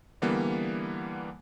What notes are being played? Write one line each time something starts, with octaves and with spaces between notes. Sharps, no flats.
D3 E3 G3 A#3 B3